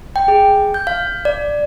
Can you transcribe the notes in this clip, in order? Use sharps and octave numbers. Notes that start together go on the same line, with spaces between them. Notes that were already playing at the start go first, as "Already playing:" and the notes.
G5
G#4
G6
F5
D5